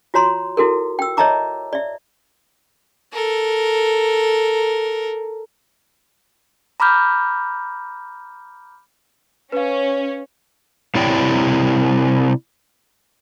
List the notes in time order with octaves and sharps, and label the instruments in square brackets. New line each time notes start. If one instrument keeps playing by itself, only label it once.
[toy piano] F4 F#4 C#5 A#5 C6
E4 F#4 A4 A#4
G5 E6
C#5 D#5 E5 A5 A#5 D6
D5 E5
[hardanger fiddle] A4 A#4
[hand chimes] A#5 B5 D6 F6 G6
[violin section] C#4 [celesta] B4 F5
[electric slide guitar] C3 E4 C#5 D5 G5